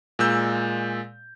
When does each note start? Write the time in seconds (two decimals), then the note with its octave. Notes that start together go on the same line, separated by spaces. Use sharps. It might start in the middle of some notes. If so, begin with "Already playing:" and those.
0.19 A#2 G#3 E6 G6